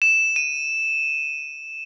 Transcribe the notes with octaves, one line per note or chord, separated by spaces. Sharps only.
E7
D#7